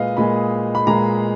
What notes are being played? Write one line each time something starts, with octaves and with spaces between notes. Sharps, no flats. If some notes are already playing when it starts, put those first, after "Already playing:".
Already playing: A#2 G#3 B4 D#5 F5
A#2 G#3 B5
B5
A#2 G#3 A#5